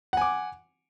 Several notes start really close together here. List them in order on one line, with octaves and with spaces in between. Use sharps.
F#5 G#5 D6